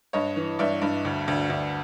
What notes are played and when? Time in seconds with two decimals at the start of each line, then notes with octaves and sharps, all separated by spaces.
0.13 G2 C#5 D#5
0.36 E3
0.59 G2 D5 E5
0.82 G2
1.05 D2
1.28 D2
1.50 D2